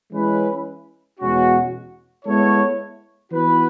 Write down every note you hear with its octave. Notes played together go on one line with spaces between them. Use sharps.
E3 G#3 C#4 E4 B4
E2 B2 G#3 C#4 F#4
G#3 B3 E4 A4 C#5
E3 B3 F#4 B4